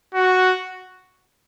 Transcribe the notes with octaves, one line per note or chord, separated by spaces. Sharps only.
F#4